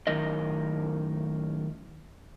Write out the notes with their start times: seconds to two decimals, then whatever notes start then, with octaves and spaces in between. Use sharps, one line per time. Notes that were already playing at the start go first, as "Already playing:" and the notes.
0.07 F#2 A2 D#3 D#4 A#4 D#5